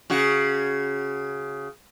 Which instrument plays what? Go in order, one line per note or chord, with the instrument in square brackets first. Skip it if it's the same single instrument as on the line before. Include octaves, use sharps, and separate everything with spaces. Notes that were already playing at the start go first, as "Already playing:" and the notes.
[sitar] C#3 F#4